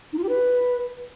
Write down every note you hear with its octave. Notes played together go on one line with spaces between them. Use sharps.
D#4
F4
G4
B4